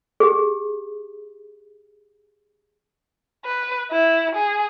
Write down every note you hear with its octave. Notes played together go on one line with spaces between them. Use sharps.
G4 G#4
B4
E4
G#4